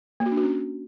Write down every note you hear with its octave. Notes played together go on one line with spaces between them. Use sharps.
A#3
F#4
D4
F#4
C#4